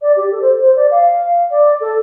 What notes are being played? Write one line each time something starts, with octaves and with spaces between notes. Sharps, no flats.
D5
G4
A4
C5
C5
D5
F5
D5
A4